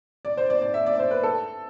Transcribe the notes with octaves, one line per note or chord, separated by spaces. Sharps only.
D5
C5
D5
D5
E5
D5
C5
B4
A4